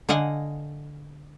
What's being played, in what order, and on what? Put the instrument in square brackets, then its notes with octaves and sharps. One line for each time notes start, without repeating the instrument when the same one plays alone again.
[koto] D3 D#5 F5 F#5 G#5